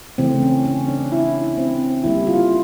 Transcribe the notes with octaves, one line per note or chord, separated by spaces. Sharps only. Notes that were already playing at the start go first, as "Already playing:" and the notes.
C#3 E3 A3 C4
C#4
C#4
D4
E4
C4
D3 G3 A#3 E4
F4